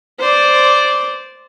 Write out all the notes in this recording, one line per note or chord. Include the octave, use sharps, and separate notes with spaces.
C5 D5